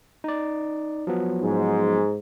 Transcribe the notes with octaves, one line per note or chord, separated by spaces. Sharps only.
D#4 D5
F3 F#3 B3
G#2